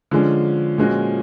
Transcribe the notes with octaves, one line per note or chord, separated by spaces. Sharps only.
D3 F3 G#3 C#4
A#2 F3 G#3 C#4 F#4